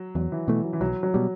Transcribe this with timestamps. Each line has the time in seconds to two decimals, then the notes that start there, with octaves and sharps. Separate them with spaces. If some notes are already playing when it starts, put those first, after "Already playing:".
Already playing: F#3
0.15 E2 F#3
0.32 E3
0.48 B2 E3 A3
0.64 F#3
0.73 E3
0.81 B1 F#3
1.03 F#3
1.14 B2 G3